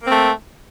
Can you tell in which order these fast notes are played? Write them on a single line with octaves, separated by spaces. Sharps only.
A#3 C4 A3